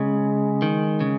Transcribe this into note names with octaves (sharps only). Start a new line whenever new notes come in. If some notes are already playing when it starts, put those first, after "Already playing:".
Already playing: C#3 G#3
D#3
C#3